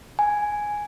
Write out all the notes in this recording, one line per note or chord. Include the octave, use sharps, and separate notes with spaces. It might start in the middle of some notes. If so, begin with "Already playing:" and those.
G#5